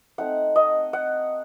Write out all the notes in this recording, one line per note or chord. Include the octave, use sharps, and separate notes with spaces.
A3 C4 D#4 F#5
D#5
F#5